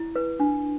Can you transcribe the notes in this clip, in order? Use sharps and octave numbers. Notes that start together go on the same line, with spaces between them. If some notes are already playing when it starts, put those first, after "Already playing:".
Already playing: E4
B4
D4